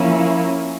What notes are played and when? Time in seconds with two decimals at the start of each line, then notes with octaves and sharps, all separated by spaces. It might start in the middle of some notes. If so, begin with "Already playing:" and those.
Already playing: F3 A#3 C#4 E4